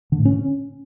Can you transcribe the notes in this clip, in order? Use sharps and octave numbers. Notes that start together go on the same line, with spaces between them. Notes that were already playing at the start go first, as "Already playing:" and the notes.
D3
A2
C#4